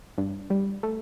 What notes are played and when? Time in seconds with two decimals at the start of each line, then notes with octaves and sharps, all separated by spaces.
0.18 G2
0.50 G3
0.83 A3